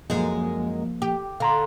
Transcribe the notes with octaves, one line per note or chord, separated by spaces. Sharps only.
F#2 F3 G#3 A#3
G4
D3 F5 A#5 C6